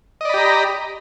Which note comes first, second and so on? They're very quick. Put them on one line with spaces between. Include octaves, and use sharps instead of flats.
D#5 D5 B5 G4 A#5